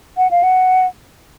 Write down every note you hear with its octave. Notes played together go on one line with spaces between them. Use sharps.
F#5
F5
F#5